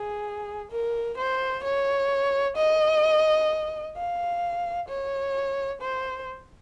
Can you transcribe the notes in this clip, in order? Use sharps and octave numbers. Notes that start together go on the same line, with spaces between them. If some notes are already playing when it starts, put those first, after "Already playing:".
Already playing: G#4
A#4
C5
C#5
D#5
F5
C#5
C5